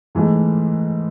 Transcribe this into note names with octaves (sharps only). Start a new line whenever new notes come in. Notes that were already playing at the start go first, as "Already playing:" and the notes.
G#2 E3 A3